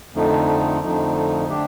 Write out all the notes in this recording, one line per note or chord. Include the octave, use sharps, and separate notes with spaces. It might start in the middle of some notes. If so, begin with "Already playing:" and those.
F2 D3 F3 A3 D#4
F2 D3 F3 A3 D#4
D3 A3 D4 G4